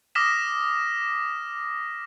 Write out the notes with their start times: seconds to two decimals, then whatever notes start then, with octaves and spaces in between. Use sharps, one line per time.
0.15 D6 D#6 F6 A#6 B6 E7